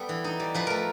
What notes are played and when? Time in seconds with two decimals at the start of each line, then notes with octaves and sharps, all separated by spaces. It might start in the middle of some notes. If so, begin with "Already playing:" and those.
Already playing: G3 B3 A4
0.09 E3
0.24 D#4
0.40 G3
0.54 F3 B4
0.67 A3 A#4